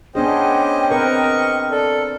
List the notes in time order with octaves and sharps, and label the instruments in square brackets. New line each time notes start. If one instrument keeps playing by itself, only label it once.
[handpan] B3 D4 G#4 [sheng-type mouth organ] C#4 C5 D#5 [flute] G5
[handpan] C4 A#4 B4 [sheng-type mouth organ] D#5 C#6
[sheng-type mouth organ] A4 [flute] D5